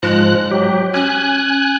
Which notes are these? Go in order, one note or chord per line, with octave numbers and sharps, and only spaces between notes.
G#2 F3 G#3 F#6
F#3 G4
C#4 G#5 F#6